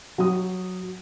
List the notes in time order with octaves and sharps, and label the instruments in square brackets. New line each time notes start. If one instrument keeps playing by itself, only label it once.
[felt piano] F#3 D#6